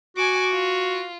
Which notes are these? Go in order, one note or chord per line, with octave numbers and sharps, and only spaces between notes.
F#4 G#5 D6
F4